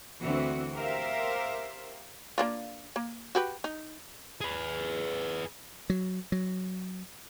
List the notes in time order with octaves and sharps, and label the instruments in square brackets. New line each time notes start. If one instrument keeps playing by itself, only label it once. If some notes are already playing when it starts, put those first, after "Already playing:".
[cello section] D2 E3 C4 F#4
G4 A#4 C5 E5 F5
[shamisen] A#3 D4 F4
A#3
F#4 G4 B4
D#4
[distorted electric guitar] G#4 B4
[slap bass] F#3
F#3